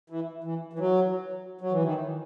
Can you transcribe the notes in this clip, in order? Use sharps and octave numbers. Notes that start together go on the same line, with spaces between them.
E3
E3
E3
F#3
F#3
E3
D#3